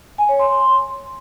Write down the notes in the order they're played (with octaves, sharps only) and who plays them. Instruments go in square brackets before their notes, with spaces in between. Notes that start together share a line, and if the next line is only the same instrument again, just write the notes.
[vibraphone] G#5
C#5
C6